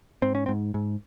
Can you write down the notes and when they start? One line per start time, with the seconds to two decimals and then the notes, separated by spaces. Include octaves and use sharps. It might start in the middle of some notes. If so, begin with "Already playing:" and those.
0.22 G#2 C4
0.35 C#4
0.46 G#2 C4
0.74 G#2